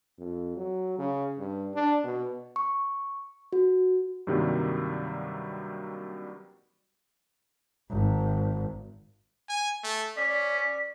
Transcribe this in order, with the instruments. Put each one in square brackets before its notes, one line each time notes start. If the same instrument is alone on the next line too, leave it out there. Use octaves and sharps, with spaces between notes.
[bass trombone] F2
F#3
C#3
G2
D4
B2
[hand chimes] C#6
F#4
[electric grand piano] G2 C3 D#3 F#3 G3 A#3
[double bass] G#1
[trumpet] G#5
A3
[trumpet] C#4 [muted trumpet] D5 [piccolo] B6